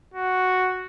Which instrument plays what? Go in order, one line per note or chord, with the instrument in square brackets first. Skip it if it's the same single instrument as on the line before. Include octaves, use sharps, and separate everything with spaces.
[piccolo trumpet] F#4